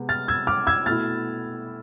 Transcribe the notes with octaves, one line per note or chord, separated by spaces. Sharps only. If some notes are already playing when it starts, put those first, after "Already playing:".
Already playing: C3 G#3 B3
F6 A6
E6 G#6
D6 F6
E6 G#6
B2 A3 E4 F6 A6